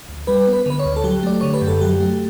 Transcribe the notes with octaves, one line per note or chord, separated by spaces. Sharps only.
D2
G3 B4
B3
B4
D3 B4
C#5
D2
A4
F#3 G4
A3 D5
D3 C#5
B4
F#2
A4
F#3 G4
A3